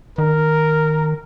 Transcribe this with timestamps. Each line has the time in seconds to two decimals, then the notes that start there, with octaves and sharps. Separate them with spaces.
0.18 D#3 A#4